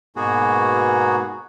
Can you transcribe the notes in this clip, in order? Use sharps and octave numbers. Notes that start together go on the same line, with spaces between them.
G#2 B2 A#3 B3 F#4 G#4